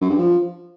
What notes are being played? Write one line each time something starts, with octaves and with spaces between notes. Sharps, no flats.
F#2
G2
F3